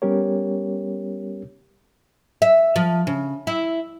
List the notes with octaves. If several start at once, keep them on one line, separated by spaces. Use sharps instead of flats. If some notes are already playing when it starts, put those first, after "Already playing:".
G3 B3 C#4 G4 A#4 C#5
E5
F3
C#3
E4